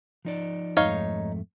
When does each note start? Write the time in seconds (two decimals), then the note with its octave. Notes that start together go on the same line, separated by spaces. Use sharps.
0.25 F3 D#4 D5
0.77 F2 G#2 A3 D#4 C#5 F5